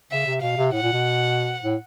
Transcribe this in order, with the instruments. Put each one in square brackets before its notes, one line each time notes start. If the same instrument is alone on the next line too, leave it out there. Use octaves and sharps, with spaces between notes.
[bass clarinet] C#3 [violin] E5
[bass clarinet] C3
[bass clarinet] B2 [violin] F5
[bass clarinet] C3
[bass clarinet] A2 [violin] F#5
[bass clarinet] A#2
B2
A2